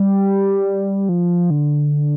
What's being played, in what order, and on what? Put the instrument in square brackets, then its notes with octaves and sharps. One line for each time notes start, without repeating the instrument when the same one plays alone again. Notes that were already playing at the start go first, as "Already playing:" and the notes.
Already playing: [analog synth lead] G3
F3
D3